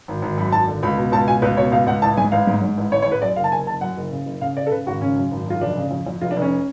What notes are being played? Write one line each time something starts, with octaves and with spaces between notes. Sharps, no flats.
G#1
G#1
F#2 B5
G#1 A5
D3
C#2 B5
B2
C#2 A5
B2 G#5
C#2 B4
B2 C#5
C#2 F5
C#2 F#5
A1 A5
G#2 G#5
A1 F5
G#2
G#2
A1
A1 C#5
C#5
A1
B4
F#2 D5
F#1 F5
A5
F#1 G#5
F#1 A5
F#2 F#5
F#1
C#3
F#1
C#3 F5
C#3 D5
A4
C#3 B4
G#1 F#4
C#3 C#4
F#2
G#1
F#2 F4
F1 D4
C#3
F2
F2
F1 F4
D4
F1
C#4